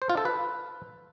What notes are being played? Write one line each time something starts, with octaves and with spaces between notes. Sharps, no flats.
C5
F4
A4
B4